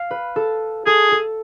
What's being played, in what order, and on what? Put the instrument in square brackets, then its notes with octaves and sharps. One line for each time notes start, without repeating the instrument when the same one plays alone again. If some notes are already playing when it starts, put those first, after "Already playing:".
Already playing: [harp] F5
B4
A4
[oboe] G#4 [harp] A4
[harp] A4